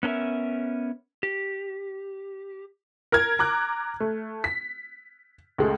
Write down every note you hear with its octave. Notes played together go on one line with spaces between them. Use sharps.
B3 C#4 A4 A#4 E5
G4
A#4 F6 G#6
A#5 D6 F#6
A3
B6
C#2 G#3 A3